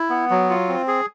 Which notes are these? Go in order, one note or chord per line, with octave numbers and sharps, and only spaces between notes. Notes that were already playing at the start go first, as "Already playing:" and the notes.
Already playing: E4
B3
F#3
F4
C4
G#4